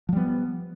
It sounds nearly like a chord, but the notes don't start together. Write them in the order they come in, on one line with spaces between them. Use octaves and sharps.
F3 G3 B3